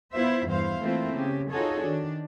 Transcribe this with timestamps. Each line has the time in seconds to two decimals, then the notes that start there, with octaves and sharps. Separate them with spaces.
0.13 B3 E4 F4 C5 E5
0.46 E2 G2 E4 C5 F5
0.80 E3 A3 A#3 C4 E4 F4
1.14 C#3 G4
1.51 D#4 F4 F#4 G#4 A4 C#5
1.82 D#3 D4